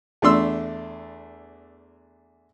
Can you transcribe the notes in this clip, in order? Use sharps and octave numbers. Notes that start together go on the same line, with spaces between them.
E2 A3 D4 C6 E6